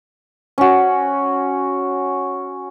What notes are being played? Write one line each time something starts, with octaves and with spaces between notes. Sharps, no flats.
C#4 F#4